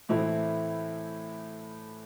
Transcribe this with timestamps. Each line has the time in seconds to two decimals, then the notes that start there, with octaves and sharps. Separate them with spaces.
0.09 A2 E3 A3 C4 E4